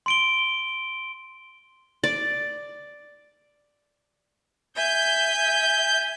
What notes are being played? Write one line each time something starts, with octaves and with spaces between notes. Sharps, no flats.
C6 D7 G7
D5
E5 G#5 G6